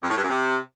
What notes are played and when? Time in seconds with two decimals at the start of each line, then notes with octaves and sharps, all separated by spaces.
0.03 F2
0.10 A2
0.16 G2
0.23 F#2
0.29 C3